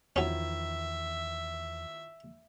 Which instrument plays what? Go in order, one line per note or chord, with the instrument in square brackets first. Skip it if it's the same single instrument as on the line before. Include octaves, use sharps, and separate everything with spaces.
[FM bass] E2 [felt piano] D#3 F3 E4 [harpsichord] F#3 C#4 [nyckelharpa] E5